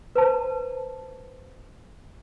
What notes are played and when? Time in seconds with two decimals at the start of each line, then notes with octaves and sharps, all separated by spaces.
0.16 B4 C5 A5